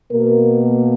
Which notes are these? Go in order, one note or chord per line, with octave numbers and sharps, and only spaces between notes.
B2 A#3 A#4